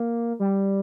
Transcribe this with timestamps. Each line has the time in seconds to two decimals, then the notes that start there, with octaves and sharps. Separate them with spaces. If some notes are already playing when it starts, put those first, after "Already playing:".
Already playing: A#3
0.40 G3